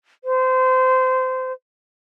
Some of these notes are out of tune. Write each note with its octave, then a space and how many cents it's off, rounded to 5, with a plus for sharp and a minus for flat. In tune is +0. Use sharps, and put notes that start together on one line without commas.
C5 -25